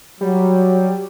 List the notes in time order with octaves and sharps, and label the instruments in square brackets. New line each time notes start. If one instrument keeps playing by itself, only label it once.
[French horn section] F#3 [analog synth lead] G3